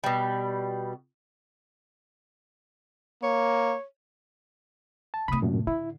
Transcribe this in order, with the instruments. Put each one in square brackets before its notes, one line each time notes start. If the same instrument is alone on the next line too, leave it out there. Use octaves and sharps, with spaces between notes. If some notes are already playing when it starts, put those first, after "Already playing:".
[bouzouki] B2 G3
[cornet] A#3 [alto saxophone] C#5
[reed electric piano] A5
[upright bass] A2 C3 [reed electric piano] B5 D#6
[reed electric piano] F#2 A#2
[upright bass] D3 [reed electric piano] E4